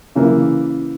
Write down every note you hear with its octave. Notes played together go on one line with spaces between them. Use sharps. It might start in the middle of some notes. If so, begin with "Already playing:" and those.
C#3 E3 A#3